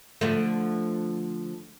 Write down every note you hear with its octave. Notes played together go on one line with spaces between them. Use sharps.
D3 F3 A3